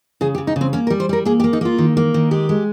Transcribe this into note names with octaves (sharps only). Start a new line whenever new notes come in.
C#3 G#4
G4
C#3
D#4
C#3
C4
A#3 C#4
A#4
G3
C5
G3 A#4
A#3 G#4
G4
A#3
D#4
A#3 F4
D#3
A#3
D#3
G#3 G4
G#3